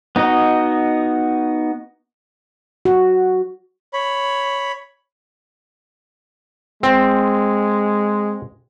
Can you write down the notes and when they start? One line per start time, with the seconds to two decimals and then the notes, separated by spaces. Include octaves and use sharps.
0.16 B3 D#4 F#4 D#5
2.85 F#4
3.93 C#5 B5
6.83 G#3 C4